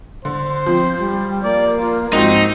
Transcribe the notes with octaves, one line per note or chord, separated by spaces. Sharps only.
D3 C5
F3 C4
G3
A#3 D5
F4
G#2 F3 C4 D#4 F#4